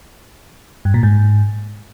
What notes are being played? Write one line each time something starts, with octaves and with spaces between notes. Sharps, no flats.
G2
A#2
G#2